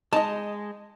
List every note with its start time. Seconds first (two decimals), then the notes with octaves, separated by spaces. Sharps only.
0.13 G#3 D#4 D#5 A5